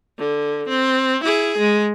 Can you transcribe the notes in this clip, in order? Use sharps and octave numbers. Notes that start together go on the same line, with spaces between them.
D3
C4
E4 G#4
G#3